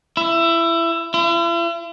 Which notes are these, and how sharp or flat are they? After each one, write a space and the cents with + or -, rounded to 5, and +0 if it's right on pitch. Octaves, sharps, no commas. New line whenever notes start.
E4 +20
E4 +45